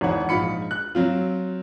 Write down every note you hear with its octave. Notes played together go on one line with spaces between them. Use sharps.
G#1 E2 E3 C#5 F#5
A#1 G#2 F4 B5 C#7
F#6
F#3 C4 F4